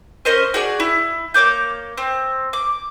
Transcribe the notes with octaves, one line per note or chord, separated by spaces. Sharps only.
C#4 A#4 C5 D#5
F#4 G#4 D5
E4
A#3 C#5 D6 G6
C4
D6